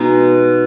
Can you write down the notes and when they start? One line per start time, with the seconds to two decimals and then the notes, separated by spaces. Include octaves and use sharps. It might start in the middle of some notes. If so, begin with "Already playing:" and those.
Already playing: B2 G#3 B3 D#4